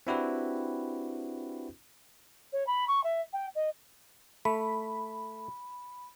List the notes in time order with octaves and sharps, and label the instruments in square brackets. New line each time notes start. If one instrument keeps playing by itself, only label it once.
[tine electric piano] C4 D4 E4 F#4 G4 B4
[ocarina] C#5
B5
C#6
E5
G5
D#5
[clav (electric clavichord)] A3 [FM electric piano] B5